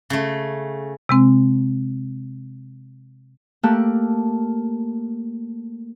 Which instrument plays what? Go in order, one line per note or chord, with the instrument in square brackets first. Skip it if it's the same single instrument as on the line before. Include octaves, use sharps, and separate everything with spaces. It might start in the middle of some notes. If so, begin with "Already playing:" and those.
[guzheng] C#3 A3
[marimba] C3 G#3 C4
[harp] A3 A#3 G4 A5 F#6